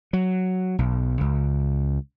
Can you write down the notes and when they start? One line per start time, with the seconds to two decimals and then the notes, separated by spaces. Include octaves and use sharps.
0.13 F#3
0.79 B1
1.21 C#2